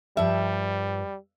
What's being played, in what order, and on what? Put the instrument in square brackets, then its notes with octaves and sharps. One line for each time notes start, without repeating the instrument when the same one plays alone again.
[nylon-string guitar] G2 F3 [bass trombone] G3 [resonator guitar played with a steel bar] E5